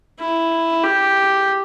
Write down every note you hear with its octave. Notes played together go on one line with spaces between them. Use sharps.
E4
G4